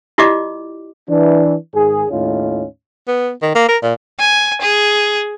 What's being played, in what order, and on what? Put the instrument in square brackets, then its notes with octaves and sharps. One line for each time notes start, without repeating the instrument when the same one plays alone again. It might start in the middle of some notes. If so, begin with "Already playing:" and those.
[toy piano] E4 F4 G4 D5 D#5 D6
[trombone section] E3 D4
G#2 D#3 G#4
D#2 A2 C#4 D#4 F4
[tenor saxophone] B3
D#3
A#3
A#4
A#2
[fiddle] G#5
G#4